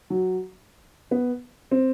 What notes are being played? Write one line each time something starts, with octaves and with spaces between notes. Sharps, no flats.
F#3
B3
C4